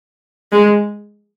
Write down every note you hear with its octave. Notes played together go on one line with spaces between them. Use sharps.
G#3